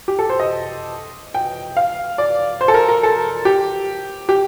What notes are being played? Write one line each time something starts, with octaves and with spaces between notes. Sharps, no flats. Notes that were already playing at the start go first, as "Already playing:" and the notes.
G4
A4
C5
D#5
G5
F5
D5
C5
A4
A#4
A#4
A4
G4
G4